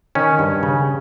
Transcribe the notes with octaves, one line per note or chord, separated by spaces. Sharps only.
D#3 C#4
G2
C#3